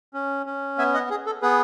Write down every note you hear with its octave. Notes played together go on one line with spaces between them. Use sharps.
C#4
C#4
B3 E5 G#5
D#5 F#5
G#4
A4
B3 G#4 B4